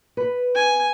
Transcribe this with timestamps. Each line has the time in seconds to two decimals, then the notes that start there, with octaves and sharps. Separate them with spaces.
0.17 B4
0.55 G#5